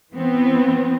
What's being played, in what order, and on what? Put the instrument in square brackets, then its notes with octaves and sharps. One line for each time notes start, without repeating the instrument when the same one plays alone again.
[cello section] E3 B3 C4